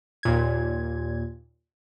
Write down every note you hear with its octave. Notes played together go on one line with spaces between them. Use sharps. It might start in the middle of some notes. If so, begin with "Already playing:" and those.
D#2 A#2 G#6